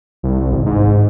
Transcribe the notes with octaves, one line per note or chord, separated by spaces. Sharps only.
C2
G#1
G#2